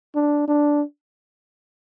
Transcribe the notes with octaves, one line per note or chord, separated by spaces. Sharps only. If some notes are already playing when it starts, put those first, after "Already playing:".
D4
D4